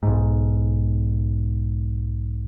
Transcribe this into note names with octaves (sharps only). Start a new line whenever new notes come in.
B1 G#2